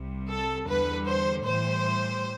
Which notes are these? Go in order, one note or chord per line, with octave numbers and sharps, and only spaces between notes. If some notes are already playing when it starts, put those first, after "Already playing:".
Already playing: C2 C3 G3
A4
E2 D3 G3 B4
C5
A2 E3 G3 C5